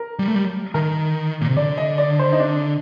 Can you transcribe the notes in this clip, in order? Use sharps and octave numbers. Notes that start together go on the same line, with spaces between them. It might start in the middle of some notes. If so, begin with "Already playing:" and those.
Already playing: A#4
G3
A3
G3
D#3 A#4
A#2
C3
D3 D5
D#5
D5
C5
D#4
D4